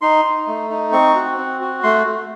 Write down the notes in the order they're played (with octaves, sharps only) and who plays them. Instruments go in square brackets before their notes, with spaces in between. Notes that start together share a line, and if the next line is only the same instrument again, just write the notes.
[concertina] D#4 C6
D#4
A3
D#4
C4 C#6
F#4
C4
F#4
A3 C6
A3